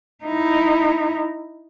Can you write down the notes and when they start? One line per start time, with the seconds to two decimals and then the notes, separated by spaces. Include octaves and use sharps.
0.25 D#4 E4